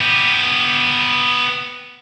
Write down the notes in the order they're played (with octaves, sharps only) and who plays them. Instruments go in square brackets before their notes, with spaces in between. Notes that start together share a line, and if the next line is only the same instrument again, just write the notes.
[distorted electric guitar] B3 G4